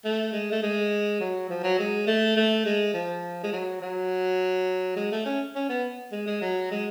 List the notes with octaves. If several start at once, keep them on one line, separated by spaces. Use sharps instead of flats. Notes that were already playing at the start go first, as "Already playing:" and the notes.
A3
G#3
A3
G#3
F#3
F3
F#3
G#3
A3
A3
G#3
F3
G#3
F#3
F#3
G#3
A3
C#4
C#4
B3
G#3
G#3
F#3
G#3